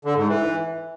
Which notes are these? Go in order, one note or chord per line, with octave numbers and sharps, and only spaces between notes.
D3
G#2
E3